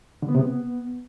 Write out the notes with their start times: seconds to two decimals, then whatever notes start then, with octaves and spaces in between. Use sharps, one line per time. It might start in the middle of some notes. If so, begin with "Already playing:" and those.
0.22 D3
0.29 B3
0.35 C3
0.41 B3